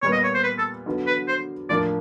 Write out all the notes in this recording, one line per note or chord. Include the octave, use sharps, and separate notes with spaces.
A#2 G3 B3 C#5
D#5
C#5
C5
B4
A4
D3 F#3 B3
B4
C5
A2 F3 A#3 D4 D5